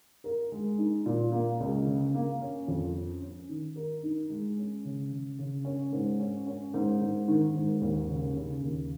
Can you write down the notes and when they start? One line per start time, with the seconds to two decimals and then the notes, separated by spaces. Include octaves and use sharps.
0.24 A#4
0.52 G#3
0.78 D#4
1.06 A#2
1.32 A#3
1.60 C#2
1.86 C#3
2.14 A#3
2.41 C#4
2.68 F2
2.95 C#4
3.22 C#4
3.49 D#3
3.76 A#4
4.03 D#4
4.30 G#3
4.57 C#4
4.85 C#3
5.12 C#3
5.39 C#3
5.65 C#4
5.93 G#2
6.20 C#4
6.47 C#4
6.74 G#2
7.01 G#2
7.28 D#3
7.55 G#2
7.82 D#2
8.09 C#3
8.35 C#3
8.62 D#2